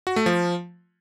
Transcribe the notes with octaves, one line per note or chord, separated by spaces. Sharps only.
F#4
A3
F3